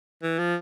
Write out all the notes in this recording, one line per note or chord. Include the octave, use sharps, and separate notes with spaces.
E3
F3